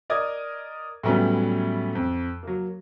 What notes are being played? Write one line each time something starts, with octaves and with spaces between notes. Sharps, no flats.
A#4 D5 D#5 D#6 G#6
A2 E3 F#3 G3 B3 C#4
F2
F#3 A#3